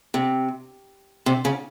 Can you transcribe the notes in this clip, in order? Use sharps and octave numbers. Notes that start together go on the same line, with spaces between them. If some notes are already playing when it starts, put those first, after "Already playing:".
C3
C3
C#3